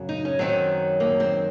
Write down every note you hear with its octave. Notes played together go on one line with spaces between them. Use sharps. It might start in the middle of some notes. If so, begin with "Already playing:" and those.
Already playing: F#2 C#3 F#3
D#4
C#4
F#2 D#3 F#3 C4
A#3
C4